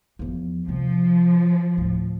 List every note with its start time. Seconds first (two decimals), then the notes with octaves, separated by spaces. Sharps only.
0.19 E2 F3
0.68 C3 F3 C4
1.77 D2 A2